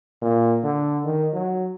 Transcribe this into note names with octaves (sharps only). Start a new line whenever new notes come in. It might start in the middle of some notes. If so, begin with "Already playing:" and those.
A#2
D3
D#3
F#3